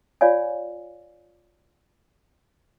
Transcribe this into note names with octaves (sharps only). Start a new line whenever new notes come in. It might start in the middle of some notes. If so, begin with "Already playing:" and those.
F4 C#5 D5 F5 G#5